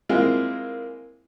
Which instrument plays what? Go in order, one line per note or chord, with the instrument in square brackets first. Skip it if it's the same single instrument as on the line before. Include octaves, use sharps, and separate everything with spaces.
[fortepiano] G#3 A#3 C4 E4 F4